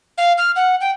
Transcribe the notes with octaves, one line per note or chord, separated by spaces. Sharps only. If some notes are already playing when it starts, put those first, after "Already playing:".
F5
F6
F#5
G5